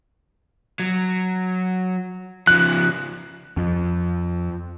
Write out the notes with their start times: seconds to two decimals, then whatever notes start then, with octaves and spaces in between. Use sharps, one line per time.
0.79 F#3
2.47 C#3 F3 F#6
3.57 F2